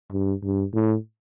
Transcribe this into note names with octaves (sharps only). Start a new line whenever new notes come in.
G2
G2
A2